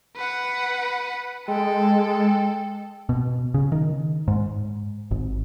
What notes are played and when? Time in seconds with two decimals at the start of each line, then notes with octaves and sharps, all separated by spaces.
0.16 B4 F#5
1.48 G#3 A4 G5
3.09 B2
3.54 C#3
3.72 D#3
4.28 G#2
5.11 G#1